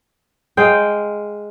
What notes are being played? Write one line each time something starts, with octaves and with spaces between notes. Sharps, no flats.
G#3 F5 G5